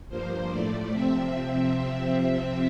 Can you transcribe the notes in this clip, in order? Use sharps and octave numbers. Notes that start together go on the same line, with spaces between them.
G2 F3 A#3 C5
A2 F3 A3 D5
C3 F3 C4 E5